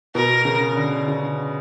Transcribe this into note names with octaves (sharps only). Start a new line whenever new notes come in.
B2 A#4
C#3
D3
C#3